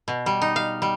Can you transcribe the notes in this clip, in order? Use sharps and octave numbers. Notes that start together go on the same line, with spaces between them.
B2
G3
D#4
F5
G3